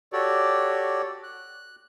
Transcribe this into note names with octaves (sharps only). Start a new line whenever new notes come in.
F#4 G4 A4 C#5 D5
F#6